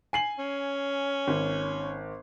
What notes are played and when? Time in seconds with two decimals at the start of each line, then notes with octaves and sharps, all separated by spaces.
0.13 G#5 C7 F#7
0.39 C#4
1.28 G#1